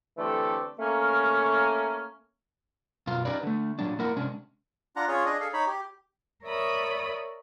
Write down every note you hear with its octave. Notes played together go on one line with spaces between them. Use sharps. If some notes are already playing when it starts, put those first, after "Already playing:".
D3 E3 A3 C4 G4 A4
A3 A#3 C#4
F#2 B2 F4
C#4 D#4 G4 B4 D5
D3 A3
A#2 F#3 D4
A#3 E4 A#4 F#5
C3 G#3 C#4 D4
D4 F4 F#5 A#5
C#4 F4 G#4 C#5
D4 G#4 D#5
G#4 A4 F5
D#4 C#5 B5
G4
A#4 C#5 D5 E5 B5 D#6